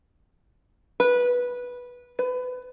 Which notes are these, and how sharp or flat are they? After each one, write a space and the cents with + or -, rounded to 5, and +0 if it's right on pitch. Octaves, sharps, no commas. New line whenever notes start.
B4 -10
B4 +25